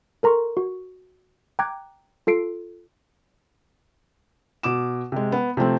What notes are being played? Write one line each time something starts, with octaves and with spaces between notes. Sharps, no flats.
A4 A#4 A#5 C6 C#6
F#4
G5 A#5 D6 F#6 G#6
F4 A4 C7 D7
B2 D6 E7
C3 G#3
B3
C3 F3 A3 C4